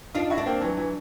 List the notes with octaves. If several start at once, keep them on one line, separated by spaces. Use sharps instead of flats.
D4 D#4 F4
E4 F#4
D4
A#3 C4
E3 F#3
E3 F#3